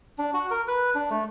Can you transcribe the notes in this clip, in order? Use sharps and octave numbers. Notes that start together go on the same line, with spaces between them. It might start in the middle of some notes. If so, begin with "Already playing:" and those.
D4
F#4
A#4
B4
D4
A3